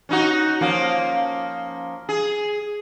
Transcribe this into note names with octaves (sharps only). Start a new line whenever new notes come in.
C#4 D#4 F#4
F3 A#3 C#4
G#4